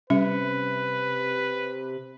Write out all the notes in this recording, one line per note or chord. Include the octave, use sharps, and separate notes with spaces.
C3 G3 C#4 B4 E5